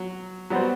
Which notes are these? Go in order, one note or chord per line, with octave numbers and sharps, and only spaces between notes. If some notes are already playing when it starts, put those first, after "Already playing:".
Already playing: F#3
F#3 G3 B3 F#4 C5